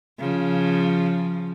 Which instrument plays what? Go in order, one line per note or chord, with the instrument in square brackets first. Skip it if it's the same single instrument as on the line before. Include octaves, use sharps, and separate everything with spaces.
[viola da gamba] C#3 F3